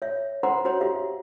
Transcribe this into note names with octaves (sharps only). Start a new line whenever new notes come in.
C#5 E5
C5 F#5 A#5 C6
F#4 C5 C#5 A#5 C6
G4 E5 F5